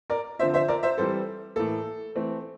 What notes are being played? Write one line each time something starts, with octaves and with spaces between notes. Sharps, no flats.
A#4 D5
D3 F3 C4 C5 E5
C5 E5
A#4 D5
C5 E5
E3 G3 C4 A4 C5
A2 E3 A#3 A4
E3 A3 C4